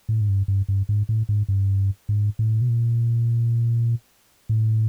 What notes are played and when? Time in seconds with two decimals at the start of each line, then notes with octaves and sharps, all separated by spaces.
0.09 A2
0.21 G#2
0.29 G2
0.48 G2
0.69 G2
0.89 G#2
1.09 A2
1.29 G#2
1.49 G2
2.09 G#2
2.39 A2
2.61 B2
2.69 A#2
4.49 A2